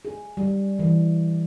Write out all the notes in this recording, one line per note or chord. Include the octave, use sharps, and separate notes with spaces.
G#4
G3
E3